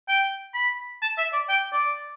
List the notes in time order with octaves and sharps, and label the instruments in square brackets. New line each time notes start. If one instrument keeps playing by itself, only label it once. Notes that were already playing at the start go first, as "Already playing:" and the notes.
[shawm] G5
B5
A5
E5
D5
G5
D5